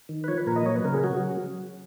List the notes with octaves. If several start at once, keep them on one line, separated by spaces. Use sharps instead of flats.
D#3
B4
F3 C#5
B4
A#2 A#4
D#5
F#3 C#5
B4
C#3 A#4
G#4
F#3 F#4